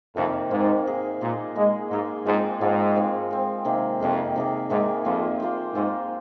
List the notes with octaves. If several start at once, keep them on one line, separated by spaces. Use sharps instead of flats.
F2 C3 D#3 A#3
G#2 C3 D#3 A#3
A#3 G#4 D#5
A#2 A#3 G#4 D#5
G#3 A#3 G#4 D#5
G#2 A#3 G#4 D#5
G#2 F3 G#3 C4
G#2 F3 G#3 C4
F3 G#3 C4
F3 G#3 C4
C3 D#3 A#3 G#4
F2 C3 D#3 A#3 G#4
C3 D#3 A#3 G#4
G#2 C3 D#3 A#3 G#4
F2 A#3 F4 C5
A#3 F4 C5
G#2 A#3 F4 C5